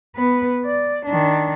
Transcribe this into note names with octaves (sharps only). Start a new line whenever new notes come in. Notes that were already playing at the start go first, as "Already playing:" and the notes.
B3 B4
D5
D#3 D4